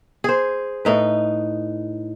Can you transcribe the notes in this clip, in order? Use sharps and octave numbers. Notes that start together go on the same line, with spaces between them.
G#4 C5
A2 D#4 B4